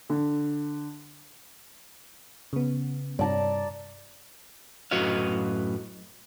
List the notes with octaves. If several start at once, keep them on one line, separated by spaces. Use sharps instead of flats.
D3
C#3 B3
G2 C3 D5 A5 A#5
F#2 A2 F#4 B4 D#5 F5